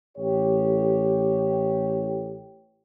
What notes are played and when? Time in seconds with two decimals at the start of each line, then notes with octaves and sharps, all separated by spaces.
0.18 A1 G4 C#5